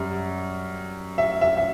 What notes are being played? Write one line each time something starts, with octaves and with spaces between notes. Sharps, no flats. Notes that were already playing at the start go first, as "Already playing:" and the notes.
Already playing: F#2 G3
E5
E5
E5